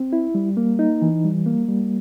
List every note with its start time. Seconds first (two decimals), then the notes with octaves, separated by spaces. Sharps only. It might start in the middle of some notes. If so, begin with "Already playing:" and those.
Already playing: C4
0.13 E4
0.35 G3
0.57 A#3
0.79 D#4
1.02 E3
1.24 G3
1.46 A#3
1.68 G3